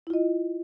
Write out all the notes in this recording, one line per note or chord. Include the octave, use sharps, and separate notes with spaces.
E4 F4 D#5